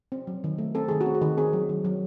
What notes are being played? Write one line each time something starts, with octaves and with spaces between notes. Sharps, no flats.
C4
F#3
D#3
A3
C4 A4
D#3 G#4
F#4
C4
G#4
D#3
C4 G#4
F#3
D#3
F#3